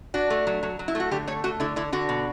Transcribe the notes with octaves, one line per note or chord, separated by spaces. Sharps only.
D4 F#4
A3
F#3
F#3
F#3
E4
A3 F#4
D3 G4
A3 C#5
A3 F#4
D3 E4
D3 E4
D3 F#4
B2